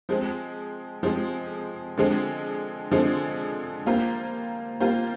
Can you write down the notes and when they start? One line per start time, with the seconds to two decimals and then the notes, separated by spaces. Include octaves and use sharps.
0.09 F3 G#3 C4
1.03 F3 G#3 C4
1.97 D3 F3 G#3 C4
2.91 D3 F3 G#3 C4
3.86 G3 A#3 F4 C5
4.80 G3 A#3 F4 C5